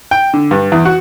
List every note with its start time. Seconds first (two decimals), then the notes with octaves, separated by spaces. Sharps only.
0.11 G5
0.34 D3
0.51 G2
0.72 E2
0.85 F#4